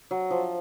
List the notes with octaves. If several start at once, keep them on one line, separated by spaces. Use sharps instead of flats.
F#3
F3